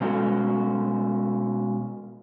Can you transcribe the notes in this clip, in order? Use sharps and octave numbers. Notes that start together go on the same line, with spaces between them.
B2 G#3 A3 C#4 F#4 A4